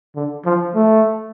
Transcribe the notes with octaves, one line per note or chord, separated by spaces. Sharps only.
D3
F3
A3